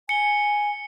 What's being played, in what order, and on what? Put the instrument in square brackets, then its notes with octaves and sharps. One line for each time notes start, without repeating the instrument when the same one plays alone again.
[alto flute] G#5 [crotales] C#7 G7